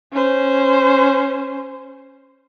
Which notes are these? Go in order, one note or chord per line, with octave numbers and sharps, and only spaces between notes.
C#4 C5